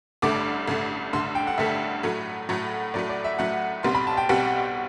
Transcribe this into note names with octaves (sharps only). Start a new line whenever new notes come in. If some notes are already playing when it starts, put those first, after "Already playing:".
A1 G2 D3 A3 D6
A1 G2 D3 A3
A1 G2 D3 A3 C6
G5
F#5
A1 G2 D3 A3 E5
A2 F#3 A3
A2 F#3 A3
A2 F#3 A3 D5
D5
E5
A2 F#3 A3 F#5
B1 B2 G3 C4 C6
B5
A5
G5
B1 B2 G3 C4 F#5